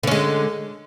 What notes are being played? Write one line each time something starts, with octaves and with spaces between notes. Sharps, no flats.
D3 G#3 C#4